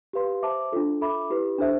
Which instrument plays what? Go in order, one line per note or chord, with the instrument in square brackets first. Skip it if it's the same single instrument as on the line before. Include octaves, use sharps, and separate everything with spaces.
[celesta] G4 B4 F5 C6
C5 E5 A5 D6
D4 F4 A4
A4 E5 B5 D6
E4 G4 B4
D4 A4 C5 E5